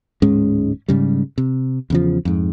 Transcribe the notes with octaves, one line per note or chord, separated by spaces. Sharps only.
D1 G#2 G#3 C#4
G#2 C#3 G3
C3
E2 C#3 F3
F2 G#2